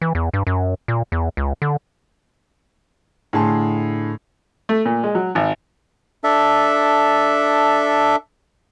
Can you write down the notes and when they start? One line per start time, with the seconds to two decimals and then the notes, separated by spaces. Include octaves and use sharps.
0.02 E3
0.15 E2
0.34 G2
0.47 F#2
0.88 A#2
1.12 E2
1.37 C#2
1.62 D3
3.33 A2 D3 G#4 A5 C6
4.69 A3
4.86 A#2
5.03 G#3
5.15 F#3
5.35 G#1
6.24 D4 A4 E5